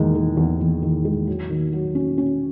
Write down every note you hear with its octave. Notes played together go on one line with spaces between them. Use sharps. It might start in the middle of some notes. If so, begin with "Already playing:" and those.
Already playing: E2 D#3 G#3
D#3
E2
E2
D#3
G#3
F#3
D#3
F#3
C#4
C#4